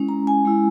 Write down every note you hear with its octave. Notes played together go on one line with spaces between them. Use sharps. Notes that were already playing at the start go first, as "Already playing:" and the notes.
Already playing: G#3 C#4 E4
A#5
G#5
G#3 C#4 E4